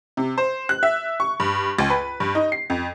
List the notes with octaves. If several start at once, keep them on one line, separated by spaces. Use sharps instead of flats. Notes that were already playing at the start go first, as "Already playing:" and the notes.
C3
C5
F#6
E5
C#6
G2
C#2
B4
G2
D#4
C7
F2